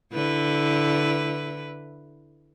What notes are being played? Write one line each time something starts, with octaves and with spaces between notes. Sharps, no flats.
D3 E4 B4